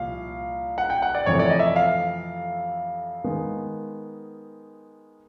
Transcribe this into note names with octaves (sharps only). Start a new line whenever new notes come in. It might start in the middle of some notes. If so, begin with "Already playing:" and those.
Already playing: C2 A#2 F3 F5
F#5
G5
F#5
D5
F2 C3 E3 A3 C#5
D5
D#5
E5
F5
D#3 G#3 B3